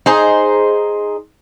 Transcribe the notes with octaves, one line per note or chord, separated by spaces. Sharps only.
D#4 G#4 C5